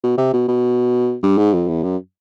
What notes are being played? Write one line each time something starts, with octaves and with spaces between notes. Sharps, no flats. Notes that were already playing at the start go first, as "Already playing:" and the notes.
B2
C3
B2
B2
G2
G#2
F2
E2
F#2